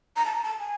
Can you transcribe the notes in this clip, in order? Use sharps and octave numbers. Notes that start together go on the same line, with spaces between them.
A#5
A5
A#5
A5
G#5